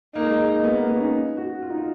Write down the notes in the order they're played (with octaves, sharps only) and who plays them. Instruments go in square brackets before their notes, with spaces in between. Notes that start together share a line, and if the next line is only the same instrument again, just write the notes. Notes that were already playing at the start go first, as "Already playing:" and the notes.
[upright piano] A#3 [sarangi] D#4
[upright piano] G#3
A#3
B3
A#3
B3
C#4
D#4
F#4
F4
D#4
F4